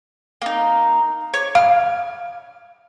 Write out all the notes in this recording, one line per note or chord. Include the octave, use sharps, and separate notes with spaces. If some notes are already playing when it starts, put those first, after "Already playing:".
A#3 D#4
C#5
F5 F6